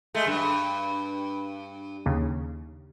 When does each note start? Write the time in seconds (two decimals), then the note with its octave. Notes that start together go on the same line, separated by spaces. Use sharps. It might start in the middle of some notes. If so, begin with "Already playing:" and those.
0.14 G#3 A3
0.27 G2
2.06 D#2 C#3